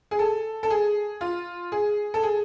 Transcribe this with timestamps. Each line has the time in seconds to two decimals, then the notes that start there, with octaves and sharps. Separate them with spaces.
0.11 G#4
0.19 A4
0.63 A4
0.70 G#4
1.21 F4
1.72 G#4
2.14 A4
2.23 G#4